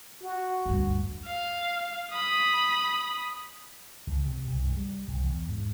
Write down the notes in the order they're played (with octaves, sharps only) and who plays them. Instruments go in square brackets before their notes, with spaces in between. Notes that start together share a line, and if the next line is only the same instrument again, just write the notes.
[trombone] F#4
[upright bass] D2 G2
[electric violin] F5
B5 D#6
[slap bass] C#2
C3
C2
G2
G3
C2
E2
G#2